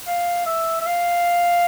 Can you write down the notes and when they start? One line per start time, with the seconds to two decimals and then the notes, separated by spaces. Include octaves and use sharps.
0.07 F5
0.46 E5
0.81 E5
0.86 F5